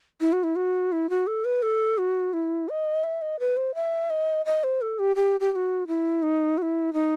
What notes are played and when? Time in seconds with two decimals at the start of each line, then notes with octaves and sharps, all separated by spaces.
0.21 E4
0.33 F#4
0.43 E4
0.56 F#4
0.92 E4
1.10 F#4
1.27 A4
1.45 B4
1.62 A4
1.98 F#4
2.33 E4
2.69 D#5
3.04 E5
3.22 D#5
3.40 B4
3.57 C5
3.75 E5
4.10 D#5
4.46 D#5
4.64 C5
4.81 A4
4.99 G4
5.16 G4
5.40 G4
5.52 G4
5.56 F#4
5.88 E4
6.23 D#4
6.58 F#4
6.62 E4
6.94 D#4